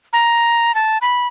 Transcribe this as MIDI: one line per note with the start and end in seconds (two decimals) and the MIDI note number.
0.13 0.75 82
0.75 0.98 81
1.02 1.27 83